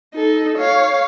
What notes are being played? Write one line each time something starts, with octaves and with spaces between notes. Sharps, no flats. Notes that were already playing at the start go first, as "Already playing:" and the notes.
D#4 A4
C#5 F5